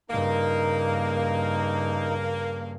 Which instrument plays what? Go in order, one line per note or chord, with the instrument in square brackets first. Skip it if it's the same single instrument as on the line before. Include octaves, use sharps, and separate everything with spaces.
[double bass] G2 C#3 [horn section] A#3 [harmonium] D#4